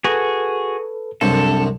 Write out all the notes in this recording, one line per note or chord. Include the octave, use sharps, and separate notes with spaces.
F#4 G#4 A4 B4
C2 F#2 C3 C4 D4 A4